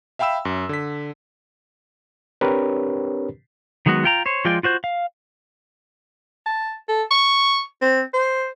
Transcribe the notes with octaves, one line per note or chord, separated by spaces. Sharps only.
E5 F5 G5 B5 E6 E7
F#2
D3 B6
C4 D4 G4 A#4 B4 C#5
D#3 F#3 G#3 B3 F#4
F4 G5 A#5
C5 C#5
F3 G#3 F4 D5 G5
F4 F#4 C5 G6
F5
A5
A4
C#6
C4
C5